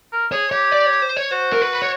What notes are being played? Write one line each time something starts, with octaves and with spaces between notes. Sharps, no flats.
A#4
G#4 C#5
G4 C#5
D5
C#5
C5
C#5
F#4 C5
A#4
B4
C#5